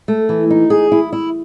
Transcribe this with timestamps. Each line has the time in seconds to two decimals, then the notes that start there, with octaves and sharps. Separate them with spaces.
0.08 A3
0.29 E3
0.50 D#4
0.70 G#4
0.92 E4
1.13 E4